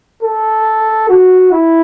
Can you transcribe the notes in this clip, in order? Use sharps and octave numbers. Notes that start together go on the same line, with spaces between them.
A4
F#4
E4